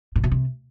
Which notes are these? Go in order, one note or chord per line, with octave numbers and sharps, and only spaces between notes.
A#2
B2
C3